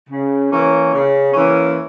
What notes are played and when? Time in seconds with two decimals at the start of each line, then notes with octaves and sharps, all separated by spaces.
0.10 C#3
0.51 E3 A#3 C#4
0.93 C#3
1.33 E3 A#3 C#4